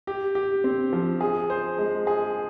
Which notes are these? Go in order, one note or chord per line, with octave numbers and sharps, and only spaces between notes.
G4
G4
C4
F3
G#4
C5
G#3
G#4